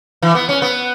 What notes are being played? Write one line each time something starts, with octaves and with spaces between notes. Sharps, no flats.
E3
B3
C#4
B3